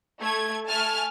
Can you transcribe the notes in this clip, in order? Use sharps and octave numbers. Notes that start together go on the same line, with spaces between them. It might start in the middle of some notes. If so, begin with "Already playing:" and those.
A3 G#6
A3 G#5 A5 F6